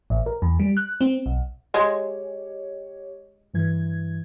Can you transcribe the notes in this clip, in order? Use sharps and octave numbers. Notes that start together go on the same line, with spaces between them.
A1
A#4
E2
G3
F#6
C4
B1
G#3 G4 C#5
G2 E3 G#6